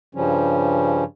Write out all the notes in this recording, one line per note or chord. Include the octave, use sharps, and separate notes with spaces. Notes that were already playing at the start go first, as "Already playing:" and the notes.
G2 C#3 F3 G3 C#4